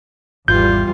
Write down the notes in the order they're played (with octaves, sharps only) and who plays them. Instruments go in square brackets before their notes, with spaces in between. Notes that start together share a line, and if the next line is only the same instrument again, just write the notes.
[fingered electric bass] G#1 [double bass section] E2 E3 G3 [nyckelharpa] F4 [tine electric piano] G6